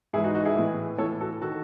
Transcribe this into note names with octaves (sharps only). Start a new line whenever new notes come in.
G#2 E3 E4 G#4
D#4 F#4
D#4 F#4
E4 G#4
A2 E3
A2 E3 A4 C#5
F#4 A4
D#3 F#4 A4